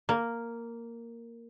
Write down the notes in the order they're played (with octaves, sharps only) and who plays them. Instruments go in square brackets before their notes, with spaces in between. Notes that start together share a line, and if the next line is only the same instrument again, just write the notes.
[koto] A#3